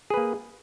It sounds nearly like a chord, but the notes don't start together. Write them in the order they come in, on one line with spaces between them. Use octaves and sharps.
G#4 B4 A#3